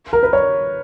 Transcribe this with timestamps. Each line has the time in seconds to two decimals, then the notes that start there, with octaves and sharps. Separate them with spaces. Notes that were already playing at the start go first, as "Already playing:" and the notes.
0.13 A#4
0.23 B4
0.33 C#5